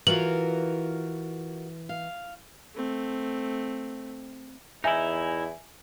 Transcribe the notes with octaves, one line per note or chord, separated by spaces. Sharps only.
E3 F4 F#4 A#4 F#7
F5
A3 C4
E2 D#4 E4 E5 G#5